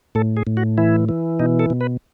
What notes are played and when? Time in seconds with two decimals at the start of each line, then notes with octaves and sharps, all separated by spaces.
0.15 A2 A4
0.37 G#4
0.47 A2
0.57 F#4
0.78 E3 E4
1.09 E3
1.40 B2 D#4
1.59 A4
1.70 B2
1.81 B4